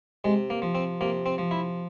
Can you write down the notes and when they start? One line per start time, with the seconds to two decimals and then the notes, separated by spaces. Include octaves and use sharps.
0.24 C3 G#3
0.50 A#3
0.62 F3
0.75 C4
1.01 C3 A#3
1.26 C4
1.38 F3
1.51 E4